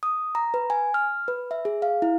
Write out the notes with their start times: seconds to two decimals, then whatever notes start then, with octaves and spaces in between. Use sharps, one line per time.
0.03 D#6
0.35 A#5
0.54 B4
0.70 G#5
0.94 F6
1.28 B4
1.51 E5
1.65 G#4
1.82 F5
2.02 E4